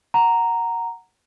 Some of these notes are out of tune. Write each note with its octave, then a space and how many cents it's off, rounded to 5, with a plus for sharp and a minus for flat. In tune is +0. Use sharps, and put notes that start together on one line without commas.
F#5 +0 A#5 -5